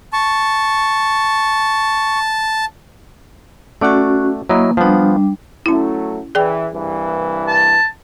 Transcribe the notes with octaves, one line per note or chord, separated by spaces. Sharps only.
A5 C#6
A3 C#4 F#4 D5 F#5
F#3 A#3 E4 D#5
F3 G3 B3 D4
F#3 A3 C#4 E4
E3 G#4 D5 G5
C2 G2 E3
A5